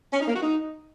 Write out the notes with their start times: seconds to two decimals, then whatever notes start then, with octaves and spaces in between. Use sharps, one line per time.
0.13 C#4
0.20 D#4
0.27 A#3
0.35 F#4
0.42 D#4